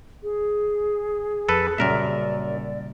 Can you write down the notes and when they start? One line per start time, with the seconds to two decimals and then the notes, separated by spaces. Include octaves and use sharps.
0.23 G#4
1.49 F2 A4 B4
1.78 F#2 A#2 C#3 G3 A#4 D5 E5